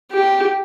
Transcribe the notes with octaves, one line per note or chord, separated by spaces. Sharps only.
G4